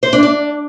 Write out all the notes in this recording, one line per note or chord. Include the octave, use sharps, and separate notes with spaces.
C5
D4
D4